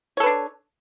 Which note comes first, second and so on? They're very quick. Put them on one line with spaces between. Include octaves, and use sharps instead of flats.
C#5 A4 B4 D4